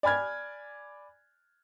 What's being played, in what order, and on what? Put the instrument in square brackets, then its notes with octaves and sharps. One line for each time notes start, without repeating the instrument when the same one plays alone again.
[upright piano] D5 G#5 B5 F6 G#6